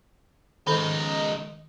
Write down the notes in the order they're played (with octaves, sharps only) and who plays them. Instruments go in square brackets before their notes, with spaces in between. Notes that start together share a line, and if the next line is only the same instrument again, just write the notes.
[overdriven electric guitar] C#2 D#4 [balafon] D#3 A4